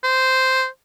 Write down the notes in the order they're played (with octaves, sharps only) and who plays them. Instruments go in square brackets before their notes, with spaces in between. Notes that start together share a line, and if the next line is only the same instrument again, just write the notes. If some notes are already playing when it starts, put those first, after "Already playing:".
[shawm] C5